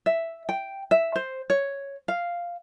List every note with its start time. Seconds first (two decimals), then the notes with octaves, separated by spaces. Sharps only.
0.06 E5
0.49 G5
0.91 E5
1.16 C5
1.50 C#5
2.08 F5